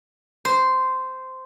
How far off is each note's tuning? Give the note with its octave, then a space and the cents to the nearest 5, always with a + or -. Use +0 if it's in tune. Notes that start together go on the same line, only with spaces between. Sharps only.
C5 -10